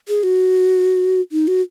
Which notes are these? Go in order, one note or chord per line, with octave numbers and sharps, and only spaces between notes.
G#4
F#4
D#4
F#4